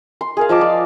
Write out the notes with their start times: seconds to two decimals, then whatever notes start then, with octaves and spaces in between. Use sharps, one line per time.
0.21 C6
0.37 G#4 A#4 F5
0.49 F3 D#5 A5 D6
0.61 D5